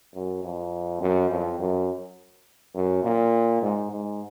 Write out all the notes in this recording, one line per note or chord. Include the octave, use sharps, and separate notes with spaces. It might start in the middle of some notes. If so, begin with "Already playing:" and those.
F#2
F2
F#2
F2
F#2
F#2
A#2
G#2
G#2